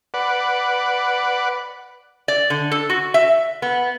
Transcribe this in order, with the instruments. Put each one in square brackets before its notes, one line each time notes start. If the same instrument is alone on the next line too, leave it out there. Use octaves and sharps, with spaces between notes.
[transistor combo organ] B4 D5 F#5
[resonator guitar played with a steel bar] D5
D3
A4
F#4
E5
B3